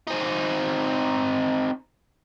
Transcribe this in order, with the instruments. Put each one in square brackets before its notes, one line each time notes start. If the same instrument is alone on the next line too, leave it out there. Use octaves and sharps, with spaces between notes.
[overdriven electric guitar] C4 D#4